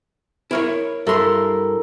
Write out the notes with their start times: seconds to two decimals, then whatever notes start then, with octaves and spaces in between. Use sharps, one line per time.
0.51 E4 A#4 C#5
1.07 G2 E4 A4 A#4 C6